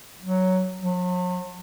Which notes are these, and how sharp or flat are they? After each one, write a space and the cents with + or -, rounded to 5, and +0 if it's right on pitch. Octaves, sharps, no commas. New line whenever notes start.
F#3 +5
F#3 -45